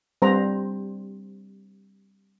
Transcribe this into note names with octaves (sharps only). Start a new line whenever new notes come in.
G3 C4 C5 A#5